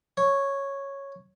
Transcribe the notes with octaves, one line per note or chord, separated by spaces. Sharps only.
C#5